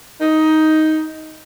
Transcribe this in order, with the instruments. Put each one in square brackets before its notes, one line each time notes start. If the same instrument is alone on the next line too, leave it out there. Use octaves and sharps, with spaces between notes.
[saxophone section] D#4